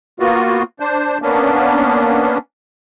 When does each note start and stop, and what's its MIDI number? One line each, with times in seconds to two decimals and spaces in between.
0.20 0.63 58
0.20 0.63 59
0.20 0.63 65
0.20 0.63 66
0.80 1.18 62
0.80 1.18 72
1.22 2.38 58
1.22 2.38 59
1.22 2.38 61
1.22 2.38 62